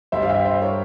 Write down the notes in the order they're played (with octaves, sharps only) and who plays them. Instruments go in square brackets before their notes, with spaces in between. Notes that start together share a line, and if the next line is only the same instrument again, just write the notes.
[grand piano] G2 G3 C5 E5
F5
E5 G5
C5 E5
A#4 C#5